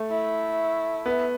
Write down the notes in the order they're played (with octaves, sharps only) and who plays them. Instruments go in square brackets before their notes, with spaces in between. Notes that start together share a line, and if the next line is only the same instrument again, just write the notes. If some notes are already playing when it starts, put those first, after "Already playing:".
Already playing: [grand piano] A3
[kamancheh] E4
[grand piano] B3